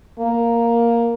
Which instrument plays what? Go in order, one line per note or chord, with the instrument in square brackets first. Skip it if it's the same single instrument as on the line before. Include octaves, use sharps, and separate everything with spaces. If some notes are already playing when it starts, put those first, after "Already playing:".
[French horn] A#3